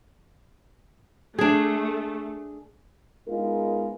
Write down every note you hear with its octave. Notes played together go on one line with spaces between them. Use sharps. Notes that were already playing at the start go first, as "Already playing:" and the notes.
A3 D4 G#4
G#3 B3 D#4 F4 G#4 A#4